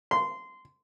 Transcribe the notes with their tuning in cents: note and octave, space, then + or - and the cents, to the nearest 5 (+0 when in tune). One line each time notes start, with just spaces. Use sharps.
C6 -20